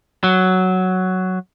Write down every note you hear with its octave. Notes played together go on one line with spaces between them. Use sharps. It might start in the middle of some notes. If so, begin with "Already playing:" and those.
F#3